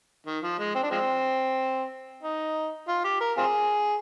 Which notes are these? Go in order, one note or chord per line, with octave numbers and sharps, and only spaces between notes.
D#3
F3
G#3
C4
D4
F3 G#3 C4
D#4
F4
G4
A#4
C4 F4 G#4